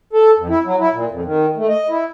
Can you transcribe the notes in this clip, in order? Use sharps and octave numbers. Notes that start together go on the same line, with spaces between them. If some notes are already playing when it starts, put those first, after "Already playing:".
A4
F2
E4
F#3
E4
A#2
F2
D#3
A3
D#5
E4